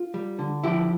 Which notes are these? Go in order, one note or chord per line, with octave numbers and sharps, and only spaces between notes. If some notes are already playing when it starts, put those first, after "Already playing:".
Already playing: F4
G3
D3
F3 E4 G4